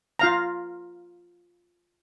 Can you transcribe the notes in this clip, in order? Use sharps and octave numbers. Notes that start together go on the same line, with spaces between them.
F4 F5 A#5